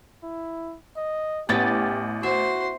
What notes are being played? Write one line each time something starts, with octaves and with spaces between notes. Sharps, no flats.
E4
D#5
A1 B3 C#4 E4 G4 A6
F#4 C5 E5 C6